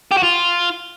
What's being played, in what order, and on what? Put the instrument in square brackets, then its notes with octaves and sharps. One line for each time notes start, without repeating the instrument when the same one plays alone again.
[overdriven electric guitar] G4
F#4
F4